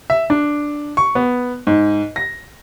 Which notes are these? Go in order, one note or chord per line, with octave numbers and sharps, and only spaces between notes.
E5
D4
C#6
B3
G#2
A#6